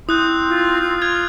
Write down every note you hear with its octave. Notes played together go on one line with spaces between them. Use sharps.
C4 E4 D#6 F#6 G6
F4
F4
F6 G#6 F7